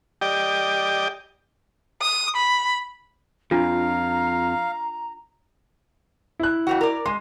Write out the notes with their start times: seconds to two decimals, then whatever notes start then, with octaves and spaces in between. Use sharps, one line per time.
0.21 G4 D5 D#5 G5
2.02 D#6
2.36 B5
3.51 F2 D4 F4 F5 A#5
6.40 E4 F#6
6.67 F2 C4 F#4
6.81 A#4 D5
7.06 G#3 C6